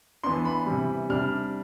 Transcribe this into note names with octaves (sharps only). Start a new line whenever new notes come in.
E3 B3 D4 C6
B5
C3 E3 G3
C3 G3 D4 F6